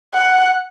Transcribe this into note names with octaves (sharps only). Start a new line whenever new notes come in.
F#5